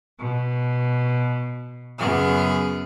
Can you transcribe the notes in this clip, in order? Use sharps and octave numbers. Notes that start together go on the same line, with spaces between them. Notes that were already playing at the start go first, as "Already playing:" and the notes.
B2
F#2 C#3 B3 G#4 F6